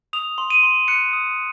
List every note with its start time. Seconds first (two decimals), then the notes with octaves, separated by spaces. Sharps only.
0.13 D#6 F7
0.38 C6
0.50 D#7
0.63 C6
0.88 F#6 C#7
1.13 D#6